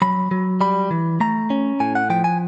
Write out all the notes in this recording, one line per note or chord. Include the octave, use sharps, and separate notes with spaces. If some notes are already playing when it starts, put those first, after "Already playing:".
F#3 B5
F#3
G3 B5
E3
A3 A#5
C#4
A2 G#5
F#5
F3 G5
G#5